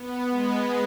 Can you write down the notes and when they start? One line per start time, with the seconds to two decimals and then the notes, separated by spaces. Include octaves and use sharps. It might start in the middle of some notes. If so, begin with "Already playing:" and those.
Already playing: B3
0.30 G#3